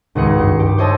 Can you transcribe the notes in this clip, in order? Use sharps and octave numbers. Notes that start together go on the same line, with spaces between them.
G#1 C#2 G#4 C#7
G2
G4
C5 C#5 D#5 A5 E6